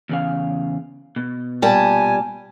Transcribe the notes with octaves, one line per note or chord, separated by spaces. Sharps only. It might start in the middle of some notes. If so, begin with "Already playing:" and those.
E2 C#3 F5
B2
A#2 G3 G#5 A5